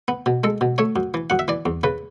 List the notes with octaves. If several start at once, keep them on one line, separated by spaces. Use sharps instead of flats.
B3
B2
G#3 A4
B2
A3 C#5
F#2
E3
F#2 F#5
E5
E3 D5
E2
C#3 B4